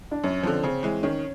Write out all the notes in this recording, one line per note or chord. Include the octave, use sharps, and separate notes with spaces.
D4
F#2 C#4
D3 F3 C4
C#3 C4
E3 G#3
D#3 C#4